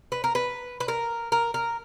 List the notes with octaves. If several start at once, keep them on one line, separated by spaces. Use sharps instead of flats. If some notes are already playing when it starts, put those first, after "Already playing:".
B4
A#4
B4
B4
A#4
A#4
A#4